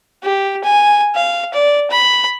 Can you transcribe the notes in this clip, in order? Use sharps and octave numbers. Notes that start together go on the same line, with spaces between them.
G4
G#5
F5
D5
B5